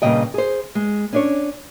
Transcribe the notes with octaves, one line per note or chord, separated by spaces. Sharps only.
G2 A#2 C#3 D#5 G5
G#4 C5
G#3
C#4 D4 C#5